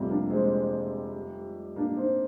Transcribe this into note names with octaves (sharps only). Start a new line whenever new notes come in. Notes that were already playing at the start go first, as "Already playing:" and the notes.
Already playing: F1 F2 C3 G3
A#3 D4
G#3 C4
A#3 D4
C4 D#4